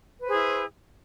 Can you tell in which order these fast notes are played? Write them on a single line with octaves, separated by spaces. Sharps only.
B4 C5 G#4 E4